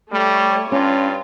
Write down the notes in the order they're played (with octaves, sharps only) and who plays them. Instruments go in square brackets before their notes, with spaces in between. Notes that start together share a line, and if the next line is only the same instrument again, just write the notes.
[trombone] G3 [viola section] A3 C#5
[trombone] G2 [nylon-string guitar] C#4 [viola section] F4